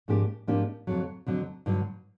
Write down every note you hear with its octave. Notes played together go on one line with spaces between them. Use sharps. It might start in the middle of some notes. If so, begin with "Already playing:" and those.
G#2 F3 A#3 D4 G4
G#2 F3 A#3 D4 G4
F2 D3 F#3
F2 D3 F#3
G2 D3 F#3